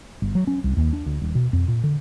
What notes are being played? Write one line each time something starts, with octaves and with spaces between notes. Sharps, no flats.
G1
F#3
C#4
C2
D#2
D4
D2
D#1
B2
F2
A#2
D3